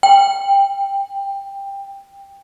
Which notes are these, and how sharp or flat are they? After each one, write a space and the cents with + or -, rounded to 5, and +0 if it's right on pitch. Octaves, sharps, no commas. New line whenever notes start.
G5 +15